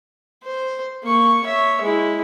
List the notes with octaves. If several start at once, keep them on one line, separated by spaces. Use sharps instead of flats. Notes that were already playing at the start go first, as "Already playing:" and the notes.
C5
A#3 C#6
C#5 E5
G#3 E4